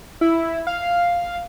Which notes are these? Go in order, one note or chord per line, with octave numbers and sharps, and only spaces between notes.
E4
F5